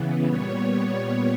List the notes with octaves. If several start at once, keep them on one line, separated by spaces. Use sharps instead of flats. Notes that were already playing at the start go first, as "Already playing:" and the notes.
Already playing: C#3 E3 B3
A#2 G3 B3 C#5
C#5